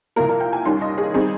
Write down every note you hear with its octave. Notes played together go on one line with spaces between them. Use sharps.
C2 A#2 F3 A#3 A#4
A#4
G5
G#5
D#2 D#3 G3 C#4 C6
D#5
G#4
G3 C4 D#4 G#4